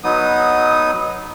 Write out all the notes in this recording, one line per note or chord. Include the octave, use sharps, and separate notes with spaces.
F#3 B3 D#4 D#6